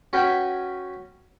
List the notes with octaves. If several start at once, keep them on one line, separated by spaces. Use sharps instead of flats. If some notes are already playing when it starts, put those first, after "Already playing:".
C#4 F#4 B4 G5 G#5 B5